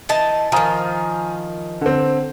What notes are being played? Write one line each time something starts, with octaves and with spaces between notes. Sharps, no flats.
E3 D#4 A5
D#3 F3 G#5 A#5 D#6
D3 C4